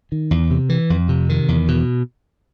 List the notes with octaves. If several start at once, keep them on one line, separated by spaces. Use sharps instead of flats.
D#3
E2
C3
E3
F2
C3
D#3
E2
B2